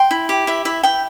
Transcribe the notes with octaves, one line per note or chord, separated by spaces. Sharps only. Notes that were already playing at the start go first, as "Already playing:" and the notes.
Already playing: G5 C6
E4
G4
E4 E5
E4 E5
E4 G5